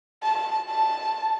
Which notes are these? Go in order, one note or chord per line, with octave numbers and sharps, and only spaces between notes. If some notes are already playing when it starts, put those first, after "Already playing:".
A5
A5